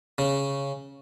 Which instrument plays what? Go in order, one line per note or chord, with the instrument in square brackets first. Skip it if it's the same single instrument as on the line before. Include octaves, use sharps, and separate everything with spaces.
[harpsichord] C#3